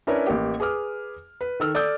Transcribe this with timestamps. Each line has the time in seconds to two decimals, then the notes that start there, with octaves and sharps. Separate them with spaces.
0.07 C#4 D4 E4 A#4 B4 C#5
0.27 A1 A#3 G4
0.60 G#4 B4 D6 F6
1.41 B4
1.60 D#3 A4 E6 F6
1.74 A4 D5 D#6 E6 G6